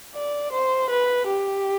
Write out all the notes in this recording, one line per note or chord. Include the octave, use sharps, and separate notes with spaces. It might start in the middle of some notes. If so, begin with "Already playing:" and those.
D5
C5
B4
G4